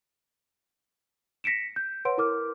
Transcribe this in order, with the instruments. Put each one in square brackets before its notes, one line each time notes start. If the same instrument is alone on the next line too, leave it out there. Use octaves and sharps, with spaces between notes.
[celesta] A#6 B6 C#7 D7 E7
G6
B4 C#5 F#5 C6 D7
E4 A#4 D6 F6